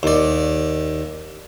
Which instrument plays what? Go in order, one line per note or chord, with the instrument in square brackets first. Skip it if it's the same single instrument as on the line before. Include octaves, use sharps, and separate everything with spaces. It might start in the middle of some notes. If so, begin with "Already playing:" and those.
[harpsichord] D#2 D5